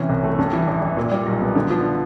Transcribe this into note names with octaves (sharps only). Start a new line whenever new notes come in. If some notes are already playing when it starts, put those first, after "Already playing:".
Already playing: C3 E3 C#4
C2
A3
G2
E3
A1
A1
A#2
G3
B1
B3
D3
F3